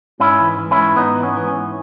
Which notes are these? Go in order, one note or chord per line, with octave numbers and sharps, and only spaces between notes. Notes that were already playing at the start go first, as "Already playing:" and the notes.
G#2 C#4 E4
E3
E3
C#4 E4
G#2
G#2 B3 D#4
E3
C#4
E3 B3
C#4
G#2